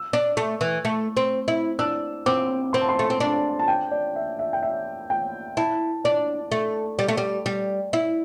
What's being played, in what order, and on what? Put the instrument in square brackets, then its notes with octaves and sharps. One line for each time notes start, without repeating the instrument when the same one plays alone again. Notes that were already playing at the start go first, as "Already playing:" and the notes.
Already playing: [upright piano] E6
[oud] D4
A3
E3
A3
C4
E4
[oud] D4 [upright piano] E6
[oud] C4 [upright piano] D6
[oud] C4 [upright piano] C6
[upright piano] A5
C6
[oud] A3
C4
[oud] D4 [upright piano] A5
[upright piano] A5
G5
D5
E5
E5
G5
E5
G5
[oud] E4 [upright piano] A5
[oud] D4 [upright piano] D5
[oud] A3
G3
A3
G3
G3
E4